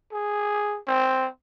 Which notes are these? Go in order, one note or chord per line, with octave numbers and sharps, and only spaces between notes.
G#4
C4